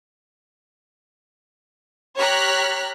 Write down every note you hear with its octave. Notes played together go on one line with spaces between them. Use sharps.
G4 C#5 A#5 F6 F#6 B6